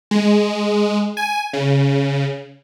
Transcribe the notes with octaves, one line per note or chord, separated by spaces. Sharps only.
G#3
G#5
C#3